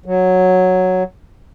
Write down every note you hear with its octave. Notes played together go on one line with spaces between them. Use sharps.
F#3